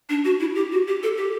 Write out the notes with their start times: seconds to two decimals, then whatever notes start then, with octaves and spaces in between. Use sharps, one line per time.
0.09 D4
0.25 F#4
0.40 E4
0.55 G4
0.72 F#4
0.88 G4
1.03 A4
1.17 G4